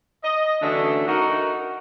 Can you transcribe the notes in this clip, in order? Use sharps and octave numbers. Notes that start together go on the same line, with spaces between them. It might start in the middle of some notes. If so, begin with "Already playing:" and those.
D#5
D3 E3 F#3 A3 C#4 D4
D#4 F#4 A#4